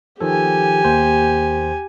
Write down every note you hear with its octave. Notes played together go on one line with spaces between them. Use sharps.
D#3 F3 G4 A4 G#5
D#2 A#3 C5